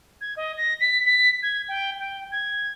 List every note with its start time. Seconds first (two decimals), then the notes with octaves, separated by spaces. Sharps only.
0.21 G#6
0.36 D#5
0.57 A#6
0.80 B6
1.05 B6
1.42 G#6
1.68 G5
1.98 G5
2.31 G#6